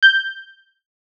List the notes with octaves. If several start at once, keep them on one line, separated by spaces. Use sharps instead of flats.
G6